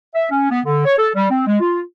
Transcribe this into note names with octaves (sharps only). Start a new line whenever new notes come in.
E5
C#4
B3
D3
C#5
A4
G3
C4
G#3
F4